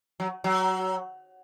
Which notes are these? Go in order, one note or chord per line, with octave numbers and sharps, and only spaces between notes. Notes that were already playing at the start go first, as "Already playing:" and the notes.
F#3
F#3